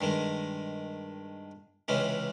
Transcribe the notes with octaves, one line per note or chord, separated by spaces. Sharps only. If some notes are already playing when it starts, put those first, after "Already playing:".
G2 D#3 G#3
C#2 C3 E3 G#3 C#4